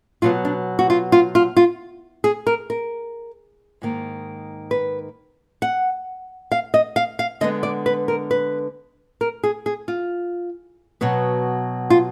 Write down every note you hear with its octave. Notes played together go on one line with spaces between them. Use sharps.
B2 F#3 B3 F4
D4
F#4
F4
F4
F4
F4
G#4
A#4
A#4
G#2 D#3 A#3
B4
F#5
F5
D#5
F5
F5
D3 G#3 B3 D#5
D5
B4
A#4
B4
A#4
G#4
G#4
F4
B2 F#3 B3
F4